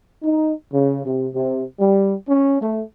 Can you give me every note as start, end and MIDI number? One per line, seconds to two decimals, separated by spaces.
0.23 0.53 63
0.72 1.03 49
1.04 1.28 48
1.34 1.63 48
1.79 2.13 55
2.28 2.60 61
2.61 2.81 57